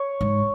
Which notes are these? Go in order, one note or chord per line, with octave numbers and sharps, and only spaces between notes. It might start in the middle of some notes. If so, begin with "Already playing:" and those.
Already playing: C#5
G#2